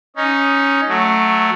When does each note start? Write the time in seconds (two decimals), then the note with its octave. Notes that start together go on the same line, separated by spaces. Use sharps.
0.16 C#4 D#4
0.88 F#3 A3